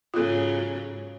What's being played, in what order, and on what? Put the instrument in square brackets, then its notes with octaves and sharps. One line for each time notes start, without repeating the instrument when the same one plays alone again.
[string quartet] G#2 C#3 F#3 [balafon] F4 A4